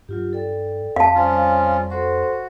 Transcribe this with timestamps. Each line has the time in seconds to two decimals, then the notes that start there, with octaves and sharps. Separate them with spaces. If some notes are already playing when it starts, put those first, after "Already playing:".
0.09 G2 F#3 F4 G4
0.33 A4 D5 G5
0.96 F2 F5 G5 A5
1.15 C#3 G3 C#4 F4 C5 D5
1.90 F#4 A4 C5 C6